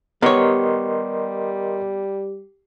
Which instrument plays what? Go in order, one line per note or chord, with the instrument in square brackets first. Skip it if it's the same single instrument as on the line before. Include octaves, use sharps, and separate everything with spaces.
[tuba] G3 [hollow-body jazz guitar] B3 C#5 [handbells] G4 [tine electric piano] A#4 D#5 C6